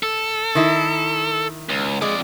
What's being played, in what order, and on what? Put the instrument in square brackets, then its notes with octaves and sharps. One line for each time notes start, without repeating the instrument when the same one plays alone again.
[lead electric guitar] A4
[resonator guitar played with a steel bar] D#3 E4
[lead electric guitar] C#2
[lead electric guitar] F2 D5 [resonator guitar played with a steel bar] G#3